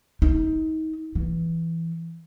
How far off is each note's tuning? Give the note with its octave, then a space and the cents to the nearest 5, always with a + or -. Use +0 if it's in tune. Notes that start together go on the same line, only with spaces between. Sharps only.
D#4 +25
E3 +5